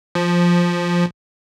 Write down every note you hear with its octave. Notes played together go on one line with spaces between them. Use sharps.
F3